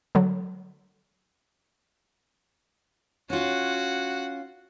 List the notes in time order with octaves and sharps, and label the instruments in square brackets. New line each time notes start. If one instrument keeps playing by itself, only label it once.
[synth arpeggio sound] D3 F#3
[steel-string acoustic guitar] C#4 F4 [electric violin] F#4 F#5